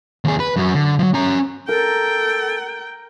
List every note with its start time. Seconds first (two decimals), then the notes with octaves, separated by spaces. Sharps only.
0.25 D#2 G#4
0.40 B4
0.56 F#2 F#3
0.74 D3
1.00 F3 F#3
1.14 C#4 A#5
1.69 A4 A#4 G5